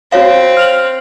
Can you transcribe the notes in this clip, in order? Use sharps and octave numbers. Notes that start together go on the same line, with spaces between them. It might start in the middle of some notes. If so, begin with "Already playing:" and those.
C4 F#4 C#5 F5
F6 F7 F#7